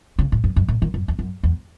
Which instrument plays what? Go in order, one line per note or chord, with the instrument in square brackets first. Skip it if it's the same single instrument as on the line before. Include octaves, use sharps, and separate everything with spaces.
[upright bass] C#3
G#2
F#2
F#2
A#2
D#3
F#2
E2
F#2
E2